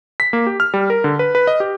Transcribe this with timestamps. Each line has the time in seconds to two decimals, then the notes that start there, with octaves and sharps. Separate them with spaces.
0.20 B6
0.33 A#3
0.47 G4
0.60 F6
0.74 G3
0.90 A#4
1.04 D3
1.19 B4
1.35 B4
1.47 D#5
1.60 G4